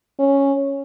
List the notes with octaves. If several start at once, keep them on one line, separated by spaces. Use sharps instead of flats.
C#4